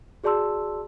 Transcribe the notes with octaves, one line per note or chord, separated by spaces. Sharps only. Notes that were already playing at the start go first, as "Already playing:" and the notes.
F#4 G#4 D5 A5 C6 E6